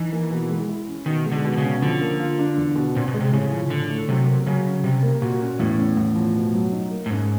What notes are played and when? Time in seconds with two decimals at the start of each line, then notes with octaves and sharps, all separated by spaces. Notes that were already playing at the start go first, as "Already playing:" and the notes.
Already playing: E3 D#4
0.13 A#3
0.31 B2
0.50 G#3
0.69 E4
0.88 C#4
1.06 B2 D#3
1.25 G#3
1.32 D3
1.45 B2
1.52 D3
1.57 C#3
1.63 C#4
1.82 D3 F3
2.01 A#3
2.19 F4
2.39 D4
2.58 E2
2.76 B2
2.95 A#2 C4
3.08 B2
3.14 G#3
3.20 C3
3.33 A2 C#3
3.52 F3
3.70 A2 D3
3.90 A3
4.08 C3 F#3
4.27 A#3
4.46 C#3 F#3
4.66 C#4
4.83 C3 G3
5.03 A#3
5.22 A#2 F#4
5.41 C#4
5.59 E2 A2
5.78 C#3
5.97 E2
6.16 F3
6.35 B2
6.54 F#3
6.72 D#4
6.91 A#3
7.06 A2
7.10 G#2 C#3